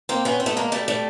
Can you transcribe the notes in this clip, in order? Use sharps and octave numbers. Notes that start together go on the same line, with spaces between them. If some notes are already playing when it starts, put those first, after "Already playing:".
A#3 C4
B3 C#4
C4
A3 B3
G#3 A#3
G3 A3
G3 A3